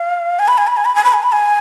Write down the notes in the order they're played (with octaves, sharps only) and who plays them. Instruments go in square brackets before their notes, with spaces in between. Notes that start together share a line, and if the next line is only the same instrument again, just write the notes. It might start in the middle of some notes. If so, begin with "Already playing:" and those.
Already playing: [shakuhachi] F5
G#5
B5
G#5
B5
G#5
B5
G#5
B5
G#5
B5
G#5